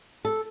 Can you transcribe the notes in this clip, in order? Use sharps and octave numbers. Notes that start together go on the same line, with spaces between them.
A4